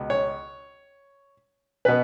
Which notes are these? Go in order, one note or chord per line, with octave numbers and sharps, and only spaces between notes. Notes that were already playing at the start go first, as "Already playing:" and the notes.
Already playing: C#2 B2
C#5
B2 B4